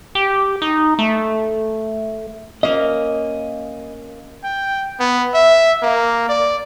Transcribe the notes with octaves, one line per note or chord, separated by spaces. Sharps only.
G4
D#4
A3
A#3 C#4 D#5
G5
B3
E5
A#3
D5